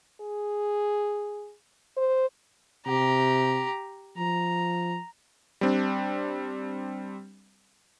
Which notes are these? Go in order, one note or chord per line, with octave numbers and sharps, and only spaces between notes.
G#4
C5
C3 G4 A#5
F3 A#5
G3 C4 D4